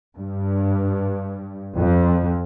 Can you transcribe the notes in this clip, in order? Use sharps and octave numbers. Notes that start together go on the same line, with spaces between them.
G2
F2